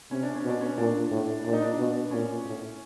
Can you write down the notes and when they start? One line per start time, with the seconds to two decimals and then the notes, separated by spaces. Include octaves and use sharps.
0.11 C3 C#4
0.23 D4
0.35 C#4
0.44 B2 D4
0.61 C#4
0.77 A#2 D4
1.11 A2
1.45 A#2 D4
1.53 D#4
1.62 D4
1.78 B2
2.11 A#2 C#4
2.45 A2